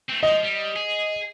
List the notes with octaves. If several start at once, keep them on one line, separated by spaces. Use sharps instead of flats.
A3 C4
F3 D#5
G3
G#4